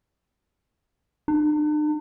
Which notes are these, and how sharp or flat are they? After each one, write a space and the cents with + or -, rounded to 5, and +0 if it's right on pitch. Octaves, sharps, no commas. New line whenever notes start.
D4 +45